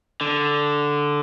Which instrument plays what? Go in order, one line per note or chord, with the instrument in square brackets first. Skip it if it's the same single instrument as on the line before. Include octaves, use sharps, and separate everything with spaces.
[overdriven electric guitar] D3